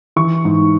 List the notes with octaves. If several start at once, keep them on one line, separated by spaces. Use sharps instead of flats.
E3 C#6
G#2